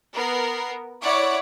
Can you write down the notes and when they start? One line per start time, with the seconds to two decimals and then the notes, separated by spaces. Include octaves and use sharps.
0.13 B3 A#4 C7
0.99 E4 C#5 D5 F#5 D6